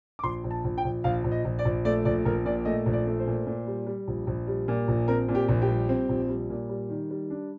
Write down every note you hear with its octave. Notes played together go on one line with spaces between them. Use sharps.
D6
A#1 C6
A#1
A5
A#1
G5
A#1
A#1 F5
A#1
D#5
A#1
D5
A#1
A3 D5
A#1 D5
A#1 A#4
A#2 D5
A3 D#5
A#1
D5
A3
C5
A#2
A#2
G3
G3
A#1
A#1
G3
A#2
A#1
C4 A#4
A#2
G4
A#1
G4
G3
C4
A#1
G3
A#2
G3
D#3
G3
D4